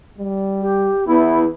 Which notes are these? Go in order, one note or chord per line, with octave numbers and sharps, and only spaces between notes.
G3
G4
E2 B3 E4 B4